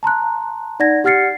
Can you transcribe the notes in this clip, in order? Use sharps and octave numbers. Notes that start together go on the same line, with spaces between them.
A5 A#5 C6 F#6
D#4 D5 F#5 G#6 A#6
G4 F#5 F6 A6 C7 C#7